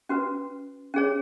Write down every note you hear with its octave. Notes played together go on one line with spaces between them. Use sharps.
C#4 F#4 B4
C#4 G#4 C#5